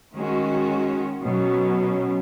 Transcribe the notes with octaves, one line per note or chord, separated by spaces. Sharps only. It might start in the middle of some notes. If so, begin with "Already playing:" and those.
D#3 G#3 C#4 F#4
B2 F#3 C#4